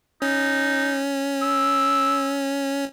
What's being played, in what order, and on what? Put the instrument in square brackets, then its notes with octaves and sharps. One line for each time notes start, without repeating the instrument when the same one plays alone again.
[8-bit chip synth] C#4 [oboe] D#4
[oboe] E6